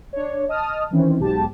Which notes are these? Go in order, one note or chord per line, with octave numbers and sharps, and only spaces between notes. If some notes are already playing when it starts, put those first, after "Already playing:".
D4 C#5
D#5 A5 D#6 F6
D#3 E3 C4 C#4
B1 G#2 G4 A5